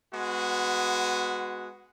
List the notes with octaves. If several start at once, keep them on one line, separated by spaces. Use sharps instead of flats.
G#3 B3 F#4